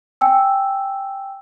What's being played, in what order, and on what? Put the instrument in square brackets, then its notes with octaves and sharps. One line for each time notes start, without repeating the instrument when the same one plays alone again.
[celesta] G5 G#5 E6